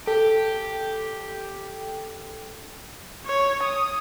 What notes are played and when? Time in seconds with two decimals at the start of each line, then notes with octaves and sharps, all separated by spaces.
0.07 G4 A4
3.26 C#5
3.63 D#6